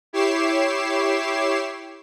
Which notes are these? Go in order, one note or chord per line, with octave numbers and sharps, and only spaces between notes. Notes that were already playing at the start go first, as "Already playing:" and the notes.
E4 G4 C#5 D6 C7 E7